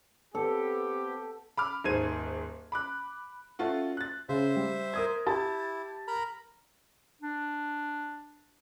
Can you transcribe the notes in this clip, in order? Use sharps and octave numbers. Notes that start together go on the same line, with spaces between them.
B3 C4 G4 A4
B5 D6 F6
D#1 G#2 C5 G#6 D#7
B5 D6 F#6
A3 C#4 F4 F#4
F#6 A6
C#3 C5 E5
G3
A#4 D#6 G#6
E4 G4 A5
A#4 A#5 B5
D4